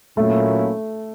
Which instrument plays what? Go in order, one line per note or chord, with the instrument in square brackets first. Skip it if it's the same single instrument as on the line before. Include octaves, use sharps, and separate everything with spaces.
[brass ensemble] A#2 F#3 A#3 C#4 E4 [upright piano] A3